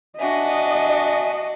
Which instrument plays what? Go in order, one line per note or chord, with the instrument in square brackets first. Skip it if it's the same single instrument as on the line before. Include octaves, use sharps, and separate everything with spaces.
[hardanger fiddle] D4 F#4 [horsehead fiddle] D#5 [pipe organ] E5 G#5